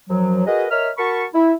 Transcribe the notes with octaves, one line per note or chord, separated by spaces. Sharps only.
F#2 F3 F#3
F#4 G#4 A#4 B4 D#5
A#4 C#5 D#5 E5 F6
F#4 A#4 A5 B5 C#6
E4